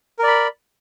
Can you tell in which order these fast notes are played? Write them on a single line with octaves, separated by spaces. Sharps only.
A#4 D5 B5